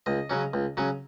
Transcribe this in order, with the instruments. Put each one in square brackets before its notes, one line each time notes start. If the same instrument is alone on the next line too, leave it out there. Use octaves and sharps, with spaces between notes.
[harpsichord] C#2 D#5
C#3 F#3 C#4
C#2
C#3 F#3 C#4